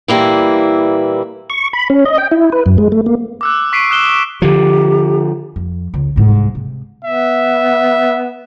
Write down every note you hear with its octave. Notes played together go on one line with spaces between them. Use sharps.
A#2 E3 G3 A#3 E4
C#6
B5
C#4
D#5
G5
E4
B4
F#2
G#3
A3
A#3
D6 E6 F#6
C#6 B6 C7 D7 D#7
D#6 F#6 E7 G7
C#6
D3 F3 G4
F2
C#2
C2 G#2
C3
B3 E5